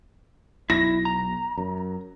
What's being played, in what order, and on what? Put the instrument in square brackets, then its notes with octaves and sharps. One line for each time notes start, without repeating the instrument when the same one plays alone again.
[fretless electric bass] B1 [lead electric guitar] E4 [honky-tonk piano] A#6
[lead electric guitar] A#5
[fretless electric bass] F#2